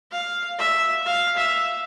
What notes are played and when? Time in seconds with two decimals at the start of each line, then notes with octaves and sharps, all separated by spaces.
0.12 F5
0.59 E5
1.06 F5
1.37 E5